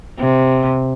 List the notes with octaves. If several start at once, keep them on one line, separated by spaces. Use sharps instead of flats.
C3